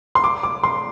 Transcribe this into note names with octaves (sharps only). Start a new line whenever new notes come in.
C6
D6
D6
C6